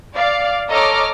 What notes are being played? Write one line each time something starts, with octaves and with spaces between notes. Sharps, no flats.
D5 F5
A4 C#5 D#5 A#5 D6 F6